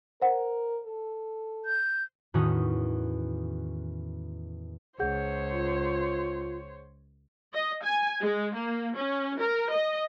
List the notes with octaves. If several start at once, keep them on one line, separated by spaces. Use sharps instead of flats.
A#4 C5 F#5
A4
G6
E2 A2 D#3 C#4 F#4 D#6
C#2 G#4 C5 C#5 F#5 G6
F4
D#5
G#5
G#3
A#3
C#4
A#4
D#5